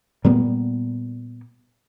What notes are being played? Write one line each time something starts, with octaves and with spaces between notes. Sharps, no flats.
A#2 G3 A#3 B3